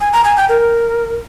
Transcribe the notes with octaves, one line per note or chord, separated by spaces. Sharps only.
G#5
A#5
G#5
G5
A#4